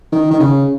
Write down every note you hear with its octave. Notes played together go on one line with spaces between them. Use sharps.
D#3
D#3
C#3